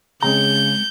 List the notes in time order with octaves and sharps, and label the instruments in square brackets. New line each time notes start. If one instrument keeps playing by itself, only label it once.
[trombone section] C#3 [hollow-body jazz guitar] G#3 C4 A#5 [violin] G6